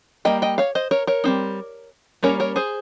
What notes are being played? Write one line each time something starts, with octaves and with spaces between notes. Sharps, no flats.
G3 A#3 D#5 G5
D#5 G5
C#5 F5
C5 D#5
A#4 C#5
A#4 C#5
G3 C4 D#4
G3 A#3 C#4 A#4 C#5
A#4 C#5
G#4 C5